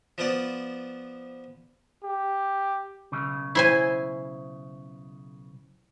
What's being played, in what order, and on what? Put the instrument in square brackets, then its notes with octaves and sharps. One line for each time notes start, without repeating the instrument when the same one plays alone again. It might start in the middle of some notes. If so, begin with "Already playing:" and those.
[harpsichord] F3 B3 F4 C5 D5
[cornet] G4
[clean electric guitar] B1 C#3
[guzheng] E4 C5 G#5